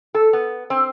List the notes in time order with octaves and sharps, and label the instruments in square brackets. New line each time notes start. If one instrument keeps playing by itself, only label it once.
[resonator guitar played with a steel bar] A4
B3
C4